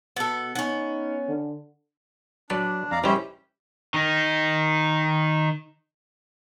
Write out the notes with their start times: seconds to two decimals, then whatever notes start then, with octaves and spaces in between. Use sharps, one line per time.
0.17 B2 B3 A4
0.55 B3 C#4 D#4
1.28 D3
2.50 F#3 D4 B4 D5 A5
2.91 F2 D5 F5 A#5
3.04 D#3 G3 C#4 E4 G4 B4 C5
3.94 D#3 D#4